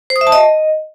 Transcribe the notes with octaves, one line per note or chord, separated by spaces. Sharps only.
C5
D#6
E5
A5
D#5